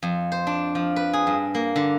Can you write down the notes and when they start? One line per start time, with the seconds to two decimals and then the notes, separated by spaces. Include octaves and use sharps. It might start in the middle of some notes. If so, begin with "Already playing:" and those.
0.03 F2
0.32 C5
0.47 D4
0.75 F3
0.96 B4
1.13 G#4
1.27 G2
1.55 A#3
1.76 D3